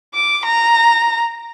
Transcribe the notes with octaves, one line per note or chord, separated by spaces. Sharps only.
D6
A#5